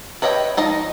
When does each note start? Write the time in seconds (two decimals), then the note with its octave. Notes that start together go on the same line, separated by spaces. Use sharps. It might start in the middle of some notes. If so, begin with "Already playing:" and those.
0.22 B4 C#5 D#5 E5 G5
0.57 F3 D#4 D#5